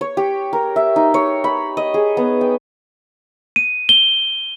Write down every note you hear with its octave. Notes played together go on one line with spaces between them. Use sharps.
C#5
G4
A#4
E5
D#4
C#5
B5
D#5
G#4
B3
G5
D#7
G7